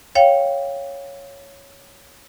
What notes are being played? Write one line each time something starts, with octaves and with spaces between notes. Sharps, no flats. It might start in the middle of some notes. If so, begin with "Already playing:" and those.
C#5 F5 G5